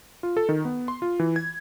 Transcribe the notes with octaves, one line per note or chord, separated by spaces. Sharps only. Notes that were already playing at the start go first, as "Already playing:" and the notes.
F4
A4
D#3
B3
C6
F4
E3
G#6